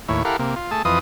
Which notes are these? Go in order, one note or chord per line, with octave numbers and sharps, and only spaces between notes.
D#2 A2 E4 C#5
E4 G4 A4 A#4 F5 F#5
C3 A#3
F4
A3 G#4 A5
F2 E3 F4 B4 D#5 D#6